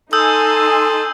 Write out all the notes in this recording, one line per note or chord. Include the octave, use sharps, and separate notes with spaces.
D#4 A4 G#5 C6 D#6 E6 G6